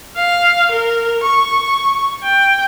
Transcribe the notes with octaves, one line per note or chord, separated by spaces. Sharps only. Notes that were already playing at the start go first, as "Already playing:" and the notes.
F5
A#4
C#6
G5